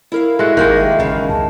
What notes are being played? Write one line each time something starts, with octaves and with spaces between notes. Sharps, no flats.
E4 A#4 F5
G#3 F#4 A4 E5
G#1 D#3 G#3 A#3 G4 A#4 G5
E5
A1 F#2 C#3 E3
C#2 A5